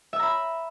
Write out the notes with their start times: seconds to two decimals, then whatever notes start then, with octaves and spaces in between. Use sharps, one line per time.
0.13 E5
0.16 E6
0.19 A#5
0.23 B5